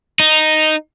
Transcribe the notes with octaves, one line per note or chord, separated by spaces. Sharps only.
D#4